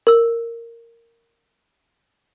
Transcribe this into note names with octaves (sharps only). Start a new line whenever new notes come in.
A#4 E6